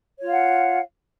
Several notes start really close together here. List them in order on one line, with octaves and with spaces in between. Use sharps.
C#5 F4 F5 F#5